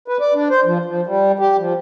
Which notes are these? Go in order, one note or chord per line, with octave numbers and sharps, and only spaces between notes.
B4
D5
D4
C5
F3
F3
G3
G4
F3